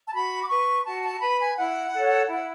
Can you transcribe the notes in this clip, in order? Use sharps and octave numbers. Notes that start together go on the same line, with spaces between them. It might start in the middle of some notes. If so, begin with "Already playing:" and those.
A5
F#4 B5
D6
B4 C#6
F#4 A5
A5
B4 B5
G#5
E4 F#5
A4 C#5
E4 F#5